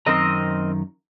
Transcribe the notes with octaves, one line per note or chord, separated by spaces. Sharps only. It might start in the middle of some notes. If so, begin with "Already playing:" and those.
F#2 D#3 C4 A#4 D#5 A#5